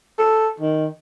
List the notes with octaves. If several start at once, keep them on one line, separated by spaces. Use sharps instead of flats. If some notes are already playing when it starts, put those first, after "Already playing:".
A4
D#3